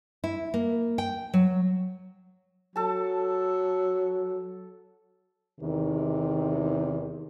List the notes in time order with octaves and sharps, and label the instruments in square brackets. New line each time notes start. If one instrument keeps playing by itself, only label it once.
[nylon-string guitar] E4
A#3
G5
F#3
[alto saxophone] F#3 [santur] A4 A5
[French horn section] E2 C3 D#3